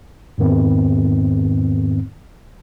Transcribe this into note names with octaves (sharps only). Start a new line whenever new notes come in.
E2 G#2 D#3 B3 C4